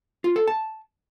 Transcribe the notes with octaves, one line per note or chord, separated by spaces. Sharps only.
F4
A4
A5